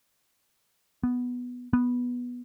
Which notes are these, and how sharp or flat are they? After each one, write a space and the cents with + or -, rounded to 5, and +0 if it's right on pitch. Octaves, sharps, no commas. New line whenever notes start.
B3 +0
B3 -10